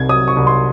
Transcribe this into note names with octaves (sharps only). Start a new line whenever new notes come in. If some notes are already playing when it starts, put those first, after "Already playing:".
Already playing: C2 C3 G#6
F#3 D#6
C#6
C2
C6